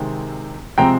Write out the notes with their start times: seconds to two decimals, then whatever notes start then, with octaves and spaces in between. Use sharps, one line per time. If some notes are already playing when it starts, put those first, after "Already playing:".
Already playing: C3 D#3 G#3 C4
0.78 C3 F3 G#3 C4 G5 A#5